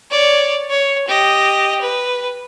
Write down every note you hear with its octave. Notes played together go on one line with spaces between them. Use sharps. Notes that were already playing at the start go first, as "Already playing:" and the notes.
C#5 D5
C#5
G4 D#5
B4